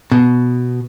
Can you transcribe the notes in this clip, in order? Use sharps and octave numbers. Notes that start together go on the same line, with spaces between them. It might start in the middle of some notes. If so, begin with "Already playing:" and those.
B2